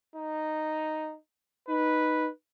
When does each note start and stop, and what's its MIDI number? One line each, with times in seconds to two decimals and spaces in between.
0.16 1.15 63
1.69 2.29 63
1.69 2.28 71